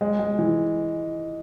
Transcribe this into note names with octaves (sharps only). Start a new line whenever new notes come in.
G#3
G#3
E3